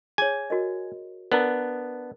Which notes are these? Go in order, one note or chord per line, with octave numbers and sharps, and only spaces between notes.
G#4 C#5 G#5
F#4 A#4 D#5
B3 D4 A#4 A#5